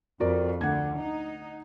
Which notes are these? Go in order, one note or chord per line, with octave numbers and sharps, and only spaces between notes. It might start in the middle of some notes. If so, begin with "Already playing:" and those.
F2 F#4 A#4 D5
D2 D3 F#5 G#6
D#4